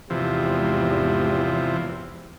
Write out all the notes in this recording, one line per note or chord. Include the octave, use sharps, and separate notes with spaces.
E2 G#2 C3 E3 F3 G4